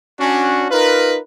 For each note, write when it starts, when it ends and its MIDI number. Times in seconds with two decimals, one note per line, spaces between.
0.20 0.66 61
0.20 0.66 62
0.20 0.66 66
0.71 1.18 63
0.71 1.18 65
0.71 1.18 70
0.71 1.18 71